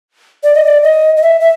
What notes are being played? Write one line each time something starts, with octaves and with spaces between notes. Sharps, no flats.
D5
D#5
D5
D#5
D#5
E5
E5